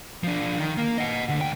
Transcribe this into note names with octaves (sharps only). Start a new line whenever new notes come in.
F3 D4
D#3
A#3
D#5 F#5
D2 D3
C#2 G5